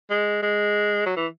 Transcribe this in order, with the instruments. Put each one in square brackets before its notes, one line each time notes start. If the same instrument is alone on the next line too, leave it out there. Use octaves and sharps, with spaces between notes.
[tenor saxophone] G#3
G#3
F#3
E3